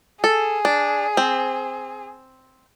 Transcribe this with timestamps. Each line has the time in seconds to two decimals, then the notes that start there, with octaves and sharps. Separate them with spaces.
0.24 G#4 A4
0.65 D4
1.17 C4